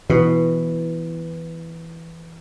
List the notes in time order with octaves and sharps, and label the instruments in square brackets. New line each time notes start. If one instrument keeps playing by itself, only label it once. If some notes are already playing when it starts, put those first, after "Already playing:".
[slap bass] B2 [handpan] E3